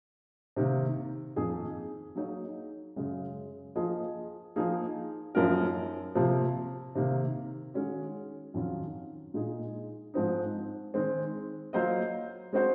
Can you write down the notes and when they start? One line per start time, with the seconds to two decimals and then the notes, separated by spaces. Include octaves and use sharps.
0.57 C3 D#3 A#3
1.36 F2 D#3 A#3 D#4 G#4
2.15 F#3 A#3 D#4 G#4 C#5
2.96 F#2 C#3 G#3
3.76 F3 A#3 F4 G#4 D#5
4.56 F3 A#3 D#4 G#4
5.35 F#2 F3 A#3 D#4 A#4
6.15 C3 F3 A#3
6.95 C3 D#3 A#3
7.74 D#3 G#3 C#4 F#4
8.54 F2 D#3 F#3 C#4 F4
9.34 A#2 G#3 D#4 G#4 D#5
10.14 G#2 F3 C4 D#4
10.94 D#3 G#3 C4
11.73 F#3 A#3 F4 C5 D#5
12.53 G#3 C4 F#4 C5